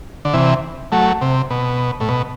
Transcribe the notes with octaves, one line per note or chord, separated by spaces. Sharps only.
D3
C3 E3
F#3 A3
C3
B2
A2
B2